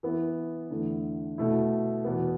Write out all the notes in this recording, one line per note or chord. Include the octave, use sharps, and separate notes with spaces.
E3 B3 E4
E2 D3 A3 E4
B2 A3 E4
E2 B2 B3